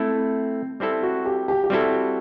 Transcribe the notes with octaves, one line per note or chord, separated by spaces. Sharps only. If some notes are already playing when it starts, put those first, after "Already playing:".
Already playing: A3 C4 E4 A4
G3 C4 E4 A4
F#4
G4
G4
G4
G3 C4 E4 F#4 A4